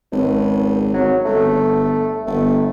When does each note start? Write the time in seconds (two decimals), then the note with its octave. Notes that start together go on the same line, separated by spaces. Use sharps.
0.12 G#1 C#2
0.94 G#1 F#3
1.25 G1 A3
2.27 G1 A3